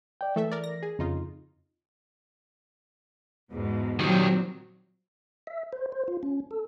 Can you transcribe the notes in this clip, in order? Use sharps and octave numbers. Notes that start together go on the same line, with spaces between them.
D5 G5
E3 A3 A4 E5
A#4 D5
A#6
G#4
F2 C#3 D#4 F4
E2 G#2 B2
A#2 D#3 F#3 G3 C4
E5
C5
C5
F4
C#4
A4